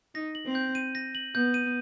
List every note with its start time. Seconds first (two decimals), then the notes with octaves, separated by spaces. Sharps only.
0.15 D#4 A#6
0.35 F#7
0.46 C4
0.55 G6
0.75 D#7
0.95 A#6
1.15 F#7
1.34 B3 G6
1.54 D#7